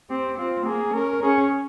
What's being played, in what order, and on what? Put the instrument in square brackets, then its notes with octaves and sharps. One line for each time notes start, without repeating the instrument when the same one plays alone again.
[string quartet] C4 [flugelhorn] G4
[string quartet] C4 [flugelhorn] F4
[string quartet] A#3 [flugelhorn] G#4
[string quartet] C#4 [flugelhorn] A#4
[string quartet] C#4 [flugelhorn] G#4